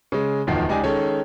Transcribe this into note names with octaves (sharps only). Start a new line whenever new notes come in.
C#3 G#3
D1 E2 D#3 F3 C7
C#2 D#4 G4 D5 G#5
D#3 G#3 C#4 A4 C#5